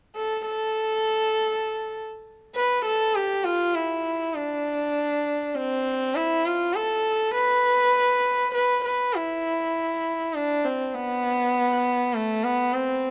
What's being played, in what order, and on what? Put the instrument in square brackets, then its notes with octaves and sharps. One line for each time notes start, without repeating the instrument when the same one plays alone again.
[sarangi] A4
A4
B4
A4
G4
F4
E4
D4
C4
E4
F4
A4
B4
B4
B4
E4
D4
C4
B3
A3
B3
C4